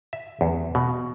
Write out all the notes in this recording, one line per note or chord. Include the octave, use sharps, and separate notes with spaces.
E5
E2
B2